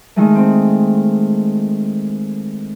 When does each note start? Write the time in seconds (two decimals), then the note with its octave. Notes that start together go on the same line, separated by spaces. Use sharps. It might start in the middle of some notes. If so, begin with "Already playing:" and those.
0.16 D#3 G#3 A3
0.35 C4